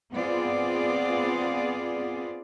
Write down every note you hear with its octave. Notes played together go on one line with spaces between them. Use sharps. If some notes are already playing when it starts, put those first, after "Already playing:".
B3 C4 F4 G#4 D5